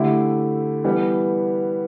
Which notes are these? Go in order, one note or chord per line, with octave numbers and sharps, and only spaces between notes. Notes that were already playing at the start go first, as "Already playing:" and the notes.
Already playing: D3 A3 E4 G4
E3 G3 B3